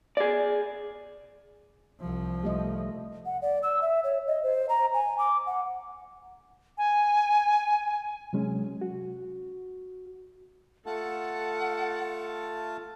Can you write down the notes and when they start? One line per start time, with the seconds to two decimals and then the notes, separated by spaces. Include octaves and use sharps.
0.17 G#4 D5
2.00 C2 F3
2.43 G3 A3 D#5
3.26 F#5
3.42 D5
3.63 E6
3.82 E5
4.04 C#5
4.27 D#5
4.43 C5
4.69 A#5
4.94 G#5
5.19 D6
5.47 F#5
6.78 G#5
8.33 C3 F#3 G#3 C#4
8.81 F#4
10.86 A3 F4 A4 F#5 A5